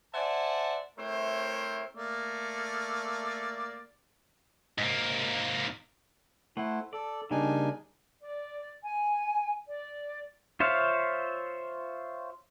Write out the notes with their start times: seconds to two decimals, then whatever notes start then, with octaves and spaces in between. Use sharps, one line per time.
0.13 C5 D5 E5 F#5 G#5 A5
0.97 A3 C4 E4 A#4 C5 C#5
1.95 A3 A#3 D5
4.78 G#2 A#3
6.57 A3 E4 C5 F#5
6.93 A4 D5
7.31 C#3 G3 A#3 D4 D#4 G#5
8.21 D5
8.83 G#5
9.67 D5
10.60 F4 C5 C#5 E5 F5